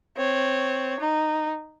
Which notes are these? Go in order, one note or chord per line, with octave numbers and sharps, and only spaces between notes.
C4 C#5
D#4